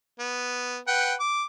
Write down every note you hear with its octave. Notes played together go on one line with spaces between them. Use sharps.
B3
B4 F#5 G5
D6